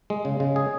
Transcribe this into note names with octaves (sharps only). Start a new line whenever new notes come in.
G#3
C#3
C#3
G#4